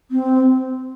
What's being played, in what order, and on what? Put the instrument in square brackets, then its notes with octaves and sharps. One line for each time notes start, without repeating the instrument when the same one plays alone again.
[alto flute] C4